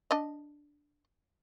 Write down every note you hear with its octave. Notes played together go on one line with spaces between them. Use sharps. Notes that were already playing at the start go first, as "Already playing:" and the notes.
D4 D#5